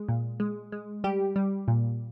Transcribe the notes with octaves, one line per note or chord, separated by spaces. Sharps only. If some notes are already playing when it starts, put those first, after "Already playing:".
Already playing: G#3
A#2
G#3
G#3
G3 G4
G3
A#2